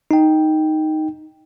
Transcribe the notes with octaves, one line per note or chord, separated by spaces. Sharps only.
D#4 G5